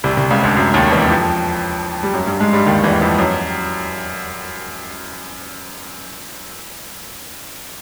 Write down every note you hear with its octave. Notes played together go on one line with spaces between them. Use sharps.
C2 C3
C2 C3
C#2 C#3
D2 D3
F#2 F#3
D#2 D#3
E2 E3
F2 F3
G3
F#2 F#3
G2 G3
G#2 G#3
G2 G3
D#2 D#3
E2 E3
F2 F3
F#2 F#3